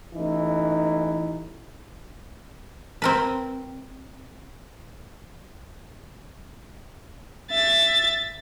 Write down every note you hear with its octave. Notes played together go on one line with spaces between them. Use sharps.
A1 E3 D#4
C4 A#4 B4
E5 A6